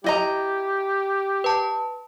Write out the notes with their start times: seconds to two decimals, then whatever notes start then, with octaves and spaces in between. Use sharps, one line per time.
0.04 E4 G4 D#5 A#5
1.44 B4 A5